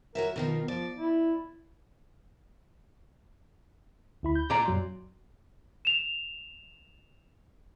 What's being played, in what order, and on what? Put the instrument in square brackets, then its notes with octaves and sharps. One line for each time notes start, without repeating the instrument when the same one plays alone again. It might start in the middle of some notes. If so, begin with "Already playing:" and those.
[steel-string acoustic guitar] F#4 C#5 E5 [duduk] A#4
[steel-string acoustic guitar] B2 D#3 F3 [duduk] A#4
[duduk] F3 [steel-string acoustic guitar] D5
[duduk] E4
[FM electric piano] D2 E4 B5
G6
[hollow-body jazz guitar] A#2 D5 A#5
[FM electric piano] F#2 F#3 C6
[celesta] E7 F7